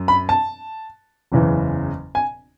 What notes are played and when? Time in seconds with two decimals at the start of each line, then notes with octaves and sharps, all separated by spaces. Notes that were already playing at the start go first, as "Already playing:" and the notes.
Already playing: F#2
0.08 B5
0.29 A5
1.32 F#1 E2 C#3 E3
2.15 G#5